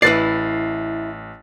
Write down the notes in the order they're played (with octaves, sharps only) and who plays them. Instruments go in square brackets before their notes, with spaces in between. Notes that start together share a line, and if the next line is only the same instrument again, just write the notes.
[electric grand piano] A1 A6 C7 [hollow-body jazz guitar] E4 B4 D5